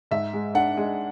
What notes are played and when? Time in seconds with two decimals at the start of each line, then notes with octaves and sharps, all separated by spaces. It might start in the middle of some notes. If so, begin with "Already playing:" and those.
0.11 G#2 E5
0.33 G#3
0.55 D4 F#5
0.77 G#3